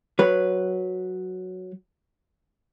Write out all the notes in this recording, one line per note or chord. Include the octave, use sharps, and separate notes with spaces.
F#3 B4